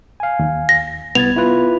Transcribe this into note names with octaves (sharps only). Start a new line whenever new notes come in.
F5 G#5
D#2
A#6
C2 B3 G#6 A6 F7
E4 F4 B4